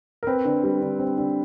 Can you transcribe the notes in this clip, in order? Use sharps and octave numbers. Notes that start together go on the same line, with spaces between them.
A#4
C4 B4
D3
G3
D3
C4
D3